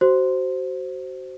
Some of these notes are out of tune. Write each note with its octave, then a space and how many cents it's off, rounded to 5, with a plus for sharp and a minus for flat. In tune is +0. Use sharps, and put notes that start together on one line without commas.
F#4 +30 C5 +0